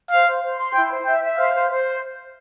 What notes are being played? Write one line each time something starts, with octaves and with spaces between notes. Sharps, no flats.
C5 F5
C5
C5
C6
E4 G5
C5
E5 G5
E5
C5 F5
C5
C5